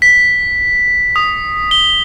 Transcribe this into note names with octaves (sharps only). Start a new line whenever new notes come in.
B6
D#6
G7